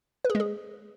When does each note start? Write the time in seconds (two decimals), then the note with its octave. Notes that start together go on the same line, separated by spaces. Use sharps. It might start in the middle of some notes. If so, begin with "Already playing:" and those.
0.25 B4
0.30 G#4
0.35 G#3
0.40 G#4